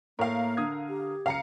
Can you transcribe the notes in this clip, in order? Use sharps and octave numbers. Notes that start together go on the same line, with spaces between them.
A2 A#3 A#4 F5
D3 D#6 G#6
G4
C#2 F5 A#5 C#7